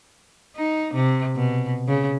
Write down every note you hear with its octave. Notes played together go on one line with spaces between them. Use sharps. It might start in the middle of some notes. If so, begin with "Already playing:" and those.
D#4
C3
B2
C#3